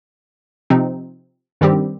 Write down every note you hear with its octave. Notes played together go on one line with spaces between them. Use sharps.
C3 F3 C4 D#4
G2 D#3 G3 C4 G4